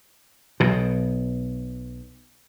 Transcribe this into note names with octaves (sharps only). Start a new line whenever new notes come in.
B1 B2